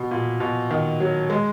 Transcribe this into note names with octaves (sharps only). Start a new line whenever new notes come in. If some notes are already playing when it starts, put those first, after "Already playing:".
Already playing: B2
A#2
B2
D#3
F#3
G#3